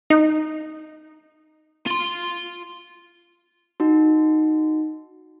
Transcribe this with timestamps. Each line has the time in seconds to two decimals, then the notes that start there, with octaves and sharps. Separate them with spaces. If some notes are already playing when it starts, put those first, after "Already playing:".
0.10 D#4
1.86 F4 C6
3.80 D#4 F#4